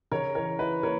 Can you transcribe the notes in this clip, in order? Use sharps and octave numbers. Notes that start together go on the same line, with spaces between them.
C#3 A#4 C#5
E3 A#4 C#5
E4 B4
A#3 A#4 C#5